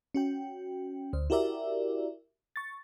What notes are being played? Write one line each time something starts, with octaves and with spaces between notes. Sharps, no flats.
C#4 F#4 G5
D2 C5
E4 F#4 G4 A#4 D5 E5
C#6 A6